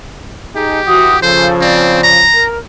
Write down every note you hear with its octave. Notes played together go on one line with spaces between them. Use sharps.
D#4 G4 G#4
E3 F#4 D#6
C#3 F3 A4 C5
C4 D5
A#5
A#4